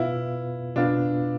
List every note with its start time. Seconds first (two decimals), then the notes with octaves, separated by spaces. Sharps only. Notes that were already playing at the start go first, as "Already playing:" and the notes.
Already playing: B2 B3 E4 F4 B4 F5
0.76 B2 B3 D4 F4 B4 F5